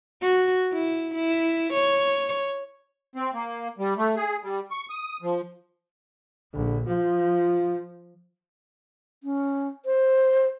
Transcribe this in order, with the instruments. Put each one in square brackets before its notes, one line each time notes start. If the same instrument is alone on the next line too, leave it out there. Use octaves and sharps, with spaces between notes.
[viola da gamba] F#4
E4
E4
C#5
[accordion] C4
A#3
G3
A3
G#4
G3
C#6
D#6
F3
[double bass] A#1 [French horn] D3
[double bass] F3 [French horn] F4
[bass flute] C#4
C5